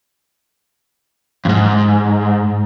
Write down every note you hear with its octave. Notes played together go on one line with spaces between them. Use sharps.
F2 G#2